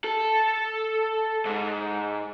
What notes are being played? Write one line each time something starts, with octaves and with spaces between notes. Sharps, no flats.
A4
G#2